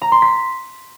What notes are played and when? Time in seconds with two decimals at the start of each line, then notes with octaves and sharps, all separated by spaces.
0.02 A#5
0.12 C6
0.22 B6